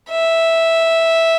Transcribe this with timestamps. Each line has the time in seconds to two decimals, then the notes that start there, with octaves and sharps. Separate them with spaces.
0.10 E5